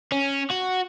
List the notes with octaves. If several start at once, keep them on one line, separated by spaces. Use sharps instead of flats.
C#4
F#4